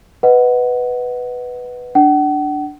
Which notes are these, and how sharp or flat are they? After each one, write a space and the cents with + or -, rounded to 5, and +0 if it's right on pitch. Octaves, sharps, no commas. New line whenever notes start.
B4 +0 D#5 +0 F#5 +0
D4 +0 F#5 +40